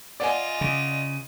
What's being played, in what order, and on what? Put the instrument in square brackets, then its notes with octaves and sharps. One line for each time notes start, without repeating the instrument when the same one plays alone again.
[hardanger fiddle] F4 D#5 [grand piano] D5 F#5 G#5
[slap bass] C#3